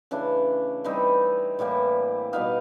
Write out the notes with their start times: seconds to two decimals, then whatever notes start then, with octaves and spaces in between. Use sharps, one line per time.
0.11 C#3 E3 A3 D4
0.84 E3 G3 C4 D#4
1.59 A2 E3 G3 A#3
2.33 B2 G3 B3 D#4 F5